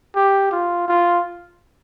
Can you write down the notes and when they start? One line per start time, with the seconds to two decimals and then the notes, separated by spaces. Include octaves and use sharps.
0.16 G4
0.52 F4
0.88 F4